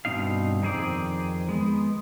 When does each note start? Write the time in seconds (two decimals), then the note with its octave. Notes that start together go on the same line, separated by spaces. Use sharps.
0.05 G2 B2 D#3 C4 D#4 F5
0.62 F2 D#3 C4 G#4 C5 D5
1.49 G#3 B3